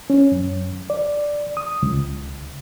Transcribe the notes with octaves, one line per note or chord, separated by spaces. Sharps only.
C#4
F#2
D5
D#6
C#2